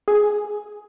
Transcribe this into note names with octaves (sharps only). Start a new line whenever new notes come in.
G#4